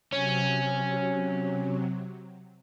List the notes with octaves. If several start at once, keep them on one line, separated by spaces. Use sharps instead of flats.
C3 F#3 C#4